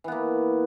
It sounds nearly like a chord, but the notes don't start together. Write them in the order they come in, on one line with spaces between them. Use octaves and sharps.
E3 B3 A#3